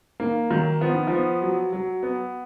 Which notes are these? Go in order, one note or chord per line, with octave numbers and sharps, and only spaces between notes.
D#3 A#3
D#3 F#3
F3 B3
D#3
F3 B3
F#3
F#3
B3